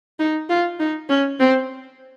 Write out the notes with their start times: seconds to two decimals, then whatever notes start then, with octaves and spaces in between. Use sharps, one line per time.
0.19 D#4
0.49 F4
0.80 D#4
1.09 C#4
1.39 C4